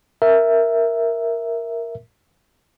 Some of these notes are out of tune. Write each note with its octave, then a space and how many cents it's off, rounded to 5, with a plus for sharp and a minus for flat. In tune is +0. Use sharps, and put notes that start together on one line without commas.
A#4 +0 E5 +0